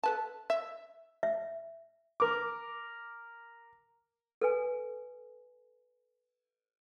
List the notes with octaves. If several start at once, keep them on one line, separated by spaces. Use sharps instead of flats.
A4 B4 A5
E5
E5
A#4 D6
A4 B4 G#5